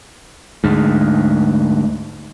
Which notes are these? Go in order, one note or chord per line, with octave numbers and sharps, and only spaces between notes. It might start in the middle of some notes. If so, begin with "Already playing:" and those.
D2 G#2